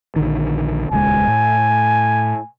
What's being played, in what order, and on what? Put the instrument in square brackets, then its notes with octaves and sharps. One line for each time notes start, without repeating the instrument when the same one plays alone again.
[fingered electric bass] A#1 D3 D#3
[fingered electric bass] D#1 C#2 G#3 [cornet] G#5
[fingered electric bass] A2